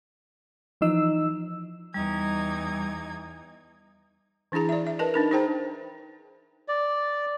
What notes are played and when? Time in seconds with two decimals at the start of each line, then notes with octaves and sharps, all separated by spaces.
0.81 E3 F3 D#4 E6
1.94 E2 G3 D#4 G#6
4.52 E3 D4 E4 G#4 A#5
4.69 D5 E5
4.87 E5
4.99 A#4 B4 D#5 A5
5.14 D4 D#4 A#4
5.32 D#4 G#4 C5 G5 A#5
6.68 D5